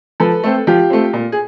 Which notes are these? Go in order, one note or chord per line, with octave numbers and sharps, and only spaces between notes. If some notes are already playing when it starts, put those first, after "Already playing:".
F3 A4 B4
A3 C4
F3 F4 G4
A3 C4
A#2
G#4